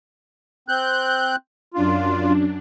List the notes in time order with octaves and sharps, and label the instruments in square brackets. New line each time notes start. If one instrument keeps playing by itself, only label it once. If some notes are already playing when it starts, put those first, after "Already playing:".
[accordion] C4 F#6 G6
[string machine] F#2 D4 [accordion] F4